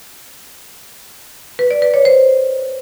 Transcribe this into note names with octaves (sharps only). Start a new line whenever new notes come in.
B4
D5
B4
C#5
C5